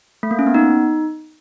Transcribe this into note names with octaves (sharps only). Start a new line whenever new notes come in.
A3
A#3
C#4
B3
D#4